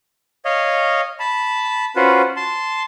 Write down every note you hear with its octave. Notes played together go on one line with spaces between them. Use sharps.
C#5 D#5 F5
A5 B5
C#4 F4 F#4 B4 C5
A5 C6